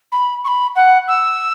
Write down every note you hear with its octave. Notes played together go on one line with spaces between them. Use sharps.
B5
C#6
B5
F#5
E6